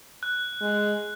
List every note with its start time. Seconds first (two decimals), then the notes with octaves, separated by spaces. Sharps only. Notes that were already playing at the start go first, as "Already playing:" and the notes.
0.23 F#6
0.61 G#3